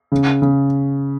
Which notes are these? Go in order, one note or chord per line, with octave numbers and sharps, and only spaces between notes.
C#3
C#3